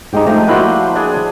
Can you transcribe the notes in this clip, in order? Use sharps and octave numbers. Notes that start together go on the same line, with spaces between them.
G#2 G#3 D#4 G4
F3 A3 D#4 D#5
A#3 D4 E4 F#4 B5 C6
D4 G#4